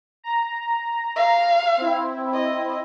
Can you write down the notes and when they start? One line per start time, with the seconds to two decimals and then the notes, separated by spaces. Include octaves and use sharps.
0.24 A#5
1.16 F5
1.77 C4 E4
2.33 D#5